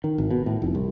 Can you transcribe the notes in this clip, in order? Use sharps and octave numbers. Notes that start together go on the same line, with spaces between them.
D#3
G#1
B2
A2
F1
C2